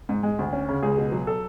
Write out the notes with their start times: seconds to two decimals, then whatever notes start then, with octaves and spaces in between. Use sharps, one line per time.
0.09 G#2
0.23 G#3
0.39 D2
0.53 C#4
0.68 C#3
0.83 C#2 G#4
0.97 B2
1.12 F#3
1.27 A4